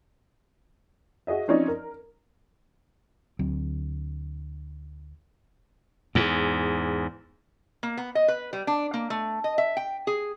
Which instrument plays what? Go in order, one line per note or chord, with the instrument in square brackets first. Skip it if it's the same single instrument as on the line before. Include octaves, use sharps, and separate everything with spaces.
[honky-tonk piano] F#4 G#4 D#5 E5
F3 C4 C#4 D#4 C#5 D5
A#4
[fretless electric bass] D2 F#3 C4
[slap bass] E2 G#2
[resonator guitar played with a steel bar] A#3
B3
D#5
B4
G3
D4
A#3
A3
D#5
E5
G5
G#4